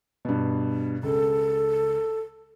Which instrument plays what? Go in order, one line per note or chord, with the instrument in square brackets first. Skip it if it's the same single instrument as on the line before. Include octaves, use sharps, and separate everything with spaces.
[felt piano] G2 B2
[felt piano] C#2 [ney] A4